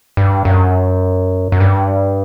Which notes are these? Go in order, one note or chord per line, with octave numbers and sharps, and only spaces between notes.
G2
F#2
F#2
G2